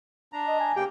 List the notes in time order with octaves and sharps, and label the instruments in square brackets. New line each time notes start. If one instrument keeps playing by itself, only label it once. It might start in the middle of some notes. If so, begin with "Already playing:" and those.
[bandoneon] D4 A#5
[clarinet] D#5
G#5
[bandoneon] C#3 A#3 G5 [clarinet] G4